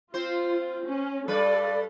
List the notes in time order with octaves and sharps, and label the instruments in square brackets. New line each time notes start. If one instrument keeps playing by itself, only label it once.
[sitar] C4 C5 [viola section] F4
[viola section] C#4
[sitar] G2 G3 B4 [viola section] A4 [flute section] D5